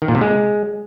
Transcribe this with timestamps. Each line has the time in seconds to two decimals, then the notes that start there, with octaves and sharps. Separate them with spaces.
0.02 D#3
0.08 A#2
0.15 C3
0.21 G#3